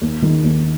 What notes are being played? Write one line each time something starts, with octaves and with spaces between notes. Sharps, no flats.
D#2
D#3 G#3 D#4
D#2